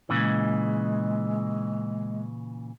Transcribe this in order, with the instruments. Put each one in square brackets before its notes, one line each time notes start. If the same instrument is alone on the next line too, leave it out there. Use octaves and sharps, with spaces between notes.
[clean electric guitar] A#2 C#3 E3 [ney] G#3